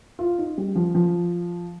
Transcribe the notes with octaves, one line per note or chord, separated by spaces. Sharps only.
F4
D#4
G3
F3
F3